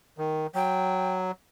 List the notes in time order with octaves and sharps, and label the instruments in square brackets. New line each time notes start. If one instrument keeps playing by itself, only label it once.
[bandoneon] D#3
[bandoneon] F#3 [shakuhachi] G5